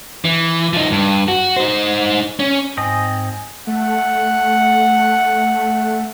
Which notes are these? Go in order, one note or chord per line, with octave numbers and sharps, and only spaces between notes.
E3
F3 D#4
G2
F#4
D#4 C5
C#4
G#2 C4 D#5 G#5
A3 F#5